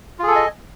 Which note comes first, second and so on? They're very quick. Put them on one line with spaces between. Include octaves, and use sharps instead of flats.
F4 G#4 A4 G#5 D#5